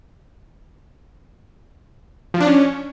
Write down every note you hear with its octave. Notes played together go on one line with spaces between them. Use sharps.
F3
D4
C#4